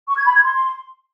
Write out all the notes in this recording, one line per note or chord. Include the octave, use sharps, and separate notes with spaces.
C#6
G#6
B5
G#6
C6